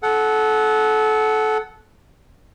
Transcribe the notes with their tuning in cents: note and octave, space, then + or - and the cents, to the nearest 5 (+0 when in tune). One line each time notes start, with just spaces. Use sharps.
A4 -25 F#5 +0